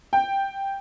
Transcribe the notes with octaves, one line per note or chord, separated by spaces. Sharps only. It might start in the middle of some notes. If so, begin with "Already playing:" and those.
G5